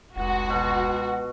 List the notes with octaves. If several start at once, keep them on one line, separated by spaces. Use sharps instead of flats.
F1 C#2 F#4
B2